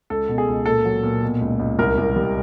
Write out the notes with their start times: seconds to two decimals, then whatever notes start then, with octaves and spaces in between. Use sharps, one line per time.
0.10 C#2 A4
0.28 B2
0.38 G#4
0.48 C#2
0.66 A#2 A4
0.85 F#3
1.03 A#2
1.23 B2
1.40 C#2
1.59 C#2
1.79 C2 A#4
1.98 C2
2.16 G3